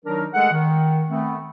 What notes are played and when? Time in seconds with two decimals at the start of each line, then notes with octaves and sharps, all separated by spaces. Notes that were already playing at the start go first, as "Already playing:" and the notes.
0.05 D#3 F#3 D4 D#4 A#4
0.34 G#3 A3 G#4 A4 F#5
0.52 D#3
1.09 A3 B3 C4